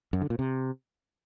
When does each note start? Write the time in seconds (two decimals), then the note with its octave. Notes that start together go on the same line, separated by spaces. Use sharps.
0.13 F#2
0.22 D3
0.30 A#2
0.39 C3